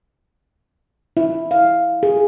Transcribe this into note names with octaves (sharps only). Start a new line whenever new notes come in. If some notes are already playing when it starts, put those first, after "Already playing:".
E4
F5
G#4